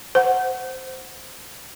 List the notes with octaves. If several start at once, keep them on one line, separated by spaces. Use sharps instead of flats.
C5 F#5